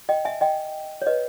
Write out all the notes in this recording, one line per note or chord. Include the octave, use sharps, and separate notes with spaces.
D#5 G5
E5 G#5
D#5 G5
C#5
B4 D#5